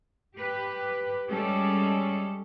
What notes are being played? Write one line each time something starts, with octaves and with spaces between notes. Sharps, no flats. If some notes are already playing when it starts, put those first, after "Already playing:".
G4 B4
G3 G#3 C#4 A4 D5